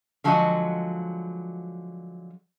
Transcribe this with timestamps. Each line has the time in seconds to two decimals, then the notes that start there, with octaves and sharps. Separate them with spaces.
0.24 D3 F3 F#3 G#3 F#4 D#5